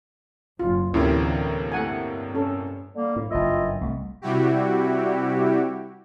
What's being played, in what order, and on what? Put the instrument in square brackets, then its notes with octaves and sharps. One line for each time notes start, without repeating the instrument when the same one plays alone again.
[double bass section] F#1 F#2 [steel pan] F4
[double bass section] D2 E3 [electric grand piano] A2 C3 A#3 [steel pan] C#4 E4 G4
[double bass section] G2 [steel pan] A3 F#5 G#5
[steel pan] C#4 A4
[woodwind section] D3 G3 A#3
[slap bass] A2
[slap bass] F#1 G2 [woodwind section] E4 F4 D#5
[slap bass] C2 A3
[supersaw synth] C3 G3 E4 F#4 G4